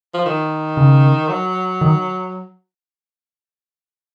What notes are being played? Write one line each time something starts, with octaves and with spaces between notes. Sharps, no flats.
F3
D#3
C#3
F#3
D#3